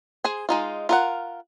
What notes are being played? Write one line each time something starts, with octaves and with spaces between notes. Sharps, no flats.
G#4 C5 G#5
G#3 D#4 F4
F4 A#4 F#5